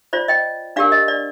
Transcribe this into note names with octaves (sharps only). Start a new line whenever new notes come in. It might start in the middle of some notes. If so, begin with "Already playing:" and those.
F4 C5 D5
D#5 G5
D4 G4 A#4 D5 F5
D#5
D5